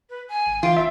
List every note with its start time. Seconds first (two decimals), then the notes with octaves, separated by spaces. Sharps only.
0.10 B4
0.29 G#5
0.47 G#1
0.63 E3 F4 G5
0.76 F1 E5